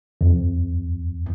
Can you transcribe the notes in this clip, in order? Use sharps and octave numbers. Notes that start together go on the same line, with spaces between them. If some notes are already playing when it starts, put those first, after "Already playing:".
F2